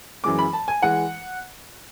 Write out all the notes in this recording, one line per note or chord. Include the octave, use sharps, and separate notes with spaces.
F#2 E3 G#3 D6
B5
A5
G#5
E3 G#3 F#5